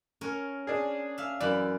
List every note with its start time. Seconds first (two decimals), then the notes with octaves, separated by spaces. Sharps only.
0.21 C#4 A#4 C#5
0.67 D4 G#4
1.18 E5 F5
1.40 F#2 E3 D5 B5